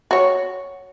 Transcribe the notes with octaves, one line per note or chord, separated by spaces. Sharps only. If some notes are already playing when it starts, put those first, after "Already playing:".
F#4 C#5